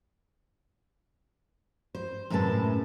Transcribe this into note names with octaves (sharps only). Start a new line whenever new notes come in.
C5
F#2 A2 C3 G#3 B4 A5